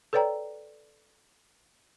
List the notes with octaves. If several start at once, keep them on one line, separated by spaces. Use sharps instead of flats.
A4 B4 C#5 D5 G5 A#5